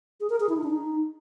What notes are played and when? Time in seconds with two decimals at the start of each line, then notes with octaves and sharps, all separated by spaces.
0.20 G#4
0.30 A#4
0.40 G#4
0.49 E4
0.57 D#4
0.63 D4
0.70 D#4